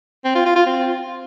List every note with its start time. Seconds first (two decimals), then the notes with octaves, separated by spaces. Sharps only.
0.25 C4
0.35 F4
0.45 F4
0.56 F4
0.66 C4